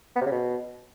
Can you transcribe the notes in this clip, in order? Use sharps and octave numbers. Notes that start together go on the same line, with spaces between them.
B3
C3
C#3
B2